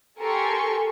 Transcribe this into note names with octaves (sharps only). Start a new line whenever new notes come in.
G4 A4 A#4 G#5 C6 C#6